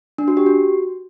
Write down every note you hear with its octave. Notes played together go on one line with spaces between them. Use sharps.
D4
F#4
G4
F#4